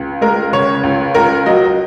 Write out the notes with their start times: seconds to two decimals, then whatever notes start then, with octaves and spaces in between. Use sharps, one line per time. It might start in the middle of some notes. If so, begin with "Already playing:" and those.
Already playing: C#2
0.21 G#3 A#4
0.53 C#3 C#5
0.83 C#2
1.15 C#2 A#4
1.46 F#3 D#5